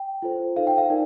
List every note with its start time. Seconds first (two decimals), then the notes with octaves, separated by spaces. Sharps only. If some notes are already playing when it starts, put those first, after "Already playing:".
Already playing: G5
0.22 F4 A4 C5
0.56 D#4 A4 C5 F5
0.67 G5
0.78 F5
0.90 D#4 A#4 D5